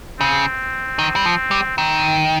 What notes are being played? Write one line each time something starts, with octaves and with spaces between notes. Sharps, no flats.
C#3 C4
D#3
G3
F3
G3
D#3 C4